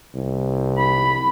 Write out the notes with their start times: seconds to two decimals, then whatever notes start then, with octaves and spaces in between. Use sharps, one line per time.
0.15 C2
0.78 B5